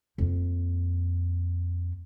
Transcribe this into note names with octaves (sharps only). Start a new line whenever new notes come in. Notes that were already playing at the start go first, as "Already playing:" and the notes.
F2 A#3